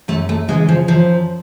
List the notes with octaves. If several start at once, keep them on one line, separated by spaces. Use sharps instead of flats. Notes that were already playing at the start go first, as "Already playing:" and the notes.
F#2 A3
A3
C#3 E3 G#3
F3
F#2 F3